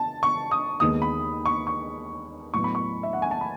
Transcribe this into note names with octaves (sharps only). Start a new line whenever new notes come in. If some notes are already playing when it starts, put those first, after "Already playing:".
Already playing: A5
C#6
D#6
D#2 D#3 G#3 B3 D#6
B5
C#6
C#6
A2 F#3 B3 C#6
B5
C#6
E5
F#5
G#5
A5
B5